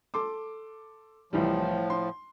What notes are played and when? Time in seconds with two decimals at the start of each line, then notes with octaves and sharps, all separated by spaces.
0.14 A4 C6 D6
1.33 C2 A2 E3 F3 G3
1.90 C6